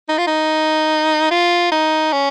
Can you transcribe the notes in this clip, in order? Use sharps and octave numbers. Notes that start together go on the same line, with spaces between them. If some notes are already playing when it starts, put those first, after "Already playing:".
D#4
F4
D#4
F4
D#4
C#4